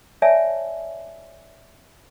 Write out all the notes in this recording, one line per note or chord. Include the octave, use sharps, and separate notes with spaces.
C#5 D5 E5 G#5 A5